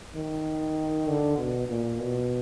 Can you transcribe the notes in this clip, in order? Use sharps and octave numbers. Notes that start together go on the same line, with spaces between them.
D#3
D3
B2
A#2
B2